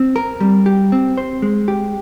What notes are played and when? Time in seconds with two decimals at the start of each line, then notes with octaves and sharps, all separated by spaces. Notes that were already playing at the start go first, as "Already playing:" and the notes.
Already playing: C4
0.16 A#4
0.40 G3
0.66 G4
0.92 C4
1.18 C5
1.42 G#3
1.68 G4